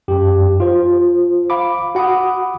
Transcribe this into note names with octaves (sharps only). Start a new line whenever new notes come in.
F#2 G4
F4 C5
F5 B5 D6
F#4 F#5 B5 D6 D#6